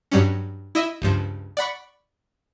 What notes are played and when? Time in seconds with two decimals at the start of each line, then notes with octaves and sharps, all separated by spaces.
0.12 G2 F#3 G3 C#4
0.75 E4 D#5 E5
1.02 C#2 G2 F3
1.57 D5 F#5 B5 C#6